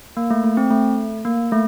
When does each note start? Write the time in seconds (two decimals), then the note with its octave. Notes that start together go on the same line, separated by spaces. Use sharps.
0.17 A#3
0.30 A3
0.44 A3
0.57 C4
0.71 A3
1.25 A#3
1.52 A3